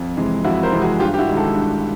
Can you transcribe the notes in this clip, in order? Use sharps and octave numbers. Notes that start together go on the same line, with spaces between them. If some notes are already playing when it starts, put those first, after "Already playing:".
Already playing: F2
C3 E3 G#3
F2 E4 F#4
A#4 C5
C3 E3 G#3
F#4 G#4
G2 F4 G4
G4
E4 F#4
D#3 G#3
G4 A4
G2